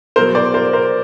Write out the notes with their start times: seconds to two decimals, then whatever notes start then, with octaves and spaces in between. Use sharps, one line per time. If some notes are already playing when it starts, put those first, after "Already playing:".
0.16 B2 F#3 A#4 C5
0.35 C5 D5
0.54 A#4 C5
0.73 A#4 C5